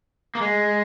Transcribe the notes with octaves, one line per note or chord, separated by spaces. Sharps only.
A#3
G#3